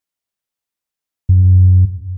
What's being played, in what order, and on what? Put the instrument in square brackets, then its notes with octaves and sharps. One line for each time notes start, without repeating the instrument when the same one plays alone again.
[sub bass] F#2